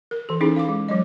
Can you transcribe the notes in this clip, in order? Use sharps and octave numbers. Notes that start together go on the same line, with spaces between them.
A#4
E3 A4
C#4 D#4 E4 G#4
F5 D6
G#3
F#3 G#3 D#5